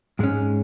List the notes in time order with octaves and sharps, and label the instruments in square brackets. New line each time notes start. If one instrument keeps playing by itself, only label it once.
[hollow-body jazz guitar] G#2 G#3 C#4